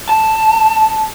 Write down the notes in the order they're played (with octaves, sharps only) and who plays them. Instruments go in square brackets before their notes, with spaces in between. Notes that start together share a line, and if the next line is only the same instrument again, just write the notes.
[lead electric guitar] A5